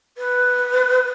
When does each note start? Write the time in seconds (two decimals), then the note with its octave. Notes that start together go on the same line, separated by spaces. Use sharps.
0.18 B4